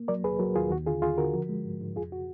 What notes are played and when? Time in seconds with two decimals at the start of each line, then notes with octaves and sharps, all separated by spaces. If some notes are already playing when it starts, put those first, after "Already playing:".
Already playing: A#3
0.08 F#3 A#4 D5
0.24 D#2 G#4 B4
0.39 F#3 F#4 A#4
0.56 D#2 F4 G#4
0.71 D#2 F#4
0.87 D3 F4 G#4
1.02 D#2 F4 G#4
1.18 D3 F#4 A#4
1.34 F3
1.49 G#3
1.65 G#2
1.81 G#2
1.96 F2 F4 G#4
2.12 F#4